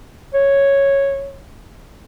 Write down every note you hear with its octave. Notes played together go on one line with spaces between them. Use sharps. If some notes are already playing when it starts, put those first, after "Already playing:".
C#5